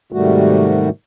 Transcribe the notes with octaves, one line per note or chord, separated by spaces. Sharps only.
G#2 C3 D#3 G3 A3 F#4